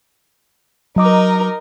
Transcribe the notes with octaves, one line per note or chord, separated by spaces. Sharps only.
F#3 D#4 A#4 D#5 D6